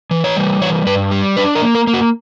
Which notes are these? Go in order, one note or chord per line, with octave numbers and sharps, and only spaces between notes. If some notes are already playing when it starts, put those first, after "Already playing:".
E3
C#5
G3
E3 C#5
G2 B4
G3
D4 B4
A#4
A#3
A#4
A#3
F#4